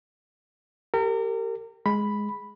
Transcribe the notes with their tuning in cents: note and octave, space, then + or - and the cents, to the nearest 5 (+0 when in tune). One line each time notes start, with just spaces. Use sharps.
G4 +0 A#4 -35
G#3 +0 B5 +0